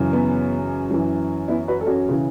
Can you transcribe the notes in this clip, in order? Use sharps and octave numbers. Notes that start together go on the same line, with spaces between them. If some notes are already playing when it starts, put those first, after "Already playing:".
Already playing: F#2 C#3 E3
B3
F#2 E3
B3 E4
F#4 B4
A4
C#4 F#4
C#3 E3